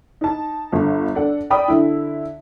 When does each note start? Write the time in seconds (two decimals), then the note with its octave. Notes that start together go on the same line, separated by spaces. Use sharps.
0.21 D#4 A5
0.72 G1 D3
1.15 D4 A4 F#5
1.50 D5 G5 B5 D#6
1.68 D3 E4